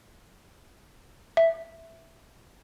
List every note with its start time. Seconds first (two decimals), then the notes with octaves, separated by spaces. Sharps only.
1.37 E5